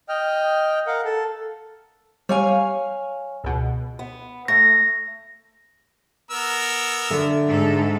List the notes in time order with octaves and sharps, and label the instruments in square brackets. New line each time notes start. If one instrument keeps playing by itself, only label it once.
[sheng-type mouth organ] D#5 G5 F6
A#4 F5 F#5
A4
[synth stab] G3 [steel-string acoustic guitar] C#5 F5 G#5
[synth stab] C#2 B2
[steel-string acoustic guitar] B3
[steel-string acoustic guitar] A3 [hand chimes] A#6
[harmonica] B3 A#4 E6
[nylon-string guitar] D3 E5 F#5
[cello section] G#2 A4